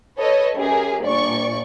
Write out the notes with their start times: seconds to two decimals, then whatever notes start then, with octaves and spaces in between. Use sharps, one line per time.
0.18 A4 B4 C#5 D#5
0.56 F#2 G4 G#4 A#4
1.03 G1 A#2 D5 C#6